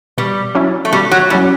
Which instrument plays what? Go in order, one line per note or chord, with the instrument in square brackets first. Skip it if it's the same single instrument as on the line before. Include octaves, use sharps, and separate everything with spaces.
[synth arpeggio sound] B2 [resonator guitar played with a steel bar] G3
[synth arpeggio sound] F#3 C#4 E4
[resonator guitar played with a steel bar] A3
[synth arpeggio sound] B2 [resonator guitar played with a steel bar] G3
[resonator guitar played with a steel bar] F#3
[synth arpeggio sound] F#3 C#4 E4 [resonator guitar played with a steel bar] G3